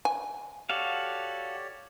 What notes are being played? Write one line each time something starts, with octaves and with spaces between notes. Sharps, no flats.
G#5
F#4 G4 A4 C#5 D5 F5